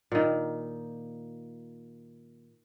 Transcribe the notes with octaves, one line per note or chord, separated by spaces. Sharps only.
A#2 D#3